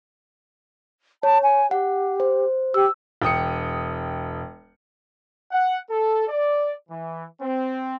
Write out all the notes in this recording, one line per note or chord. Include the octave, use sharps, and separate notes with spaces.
C#5 A5
G#5
G4 F#5
C5
G4 E6
E1 G5 D#6 C#7
F#5
A4
D5
E3
C4